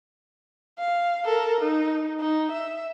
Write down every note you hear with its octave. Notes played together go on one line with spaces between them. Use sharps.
F5
A4 A#4
D#4
D#4
E5